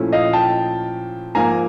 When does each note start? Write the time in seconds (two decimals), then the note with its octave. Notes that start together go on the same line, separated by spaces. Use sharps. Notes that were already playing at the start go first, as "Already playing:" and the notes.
Already playing: A#2 F3 A3 C#4 E4
0.13 D#5 F5
0.33 G5 A5
1.35 G#2 F3 A#3 G#5 A#5